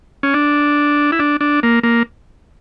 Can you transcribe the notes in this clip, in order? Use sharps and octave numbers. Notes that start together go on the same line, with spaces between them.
C#4
D4
E4
D4
D4
A#3
A#3